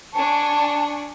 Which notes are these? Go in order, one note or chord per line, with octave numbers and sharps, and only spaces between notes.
D4 G#5 A5 C#6